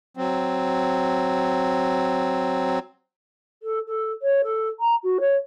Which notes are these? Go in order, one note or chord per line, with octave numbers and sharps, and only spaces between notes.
F#3 C4
A4
A4
C#5
A4
A#5
F#4
C#5